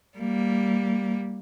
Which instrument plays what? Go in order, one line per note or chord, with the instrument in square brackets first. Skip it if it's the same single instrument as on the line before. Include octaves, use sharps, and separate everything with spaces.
[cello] G3 A#3